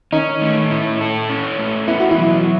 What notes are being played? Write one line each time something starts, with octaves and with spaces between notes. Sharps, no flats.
D#3 C#4 D#4
A3
E4
A4
C#4
A3
B3 E4
F#4
E3 E4
F#3